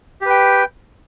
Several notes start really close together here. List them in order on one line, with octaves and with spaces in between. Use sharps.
G4 B4 G5